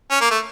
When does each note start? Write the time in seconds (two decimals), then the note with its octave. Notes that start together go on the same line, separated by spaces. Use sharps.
0.11 C#4
0.21 A#3
0.31 A3